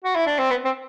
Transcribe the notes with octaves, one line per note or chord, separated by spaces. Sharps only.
F#4
E4
D4
C4
B3
C4